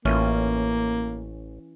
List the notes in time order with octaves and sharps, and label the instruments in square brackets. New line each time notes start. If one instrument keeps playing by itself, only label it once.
[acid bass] A1 [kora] E3 C#4 F4 [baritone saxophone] A#3